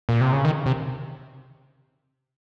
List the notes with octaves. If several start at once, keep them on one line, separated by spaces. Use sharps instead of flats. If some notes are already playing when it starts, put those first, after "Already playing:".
A#2
C3
C#3
D#3
C3